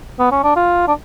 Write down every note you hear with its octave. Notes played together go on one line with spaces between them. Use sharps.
B3
C#4
D4
F4
D4